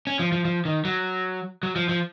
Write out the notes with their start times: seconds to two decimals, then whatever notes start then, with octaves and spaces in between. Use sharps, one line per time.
0.07 C#4
0.19 F3
0.32 F3
0.45 F3
0.65 D#3
0.85 F#3
1.63 F#3
1.76 F3
1.89 F3